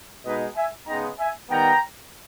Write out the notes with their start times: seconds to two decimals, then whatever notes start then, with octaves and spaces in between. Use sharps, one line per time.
0.24 B2 G#3 D#4 B4 D#5
0.56 E5 G#5
0.87 C#3 G#3 B3 D#4 G5 A#5
1.18 E5 G#5
1.49 D#3 G3 B3 G5 A#5